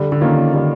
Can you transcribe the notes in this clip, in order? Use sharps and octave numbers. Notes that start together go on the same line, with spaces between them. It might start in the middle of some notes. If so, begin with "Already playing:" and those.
Already playing: D3 G3
D3
D#3 A#3 C#4 F4
D3 G3